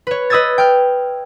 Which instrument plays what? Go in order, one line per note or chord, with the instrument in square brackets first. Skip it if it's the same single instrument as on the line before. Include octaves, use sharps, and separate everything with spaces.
[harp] B4 C#5
B4 D#5 D#6 E6 G#6 A6
G5 F6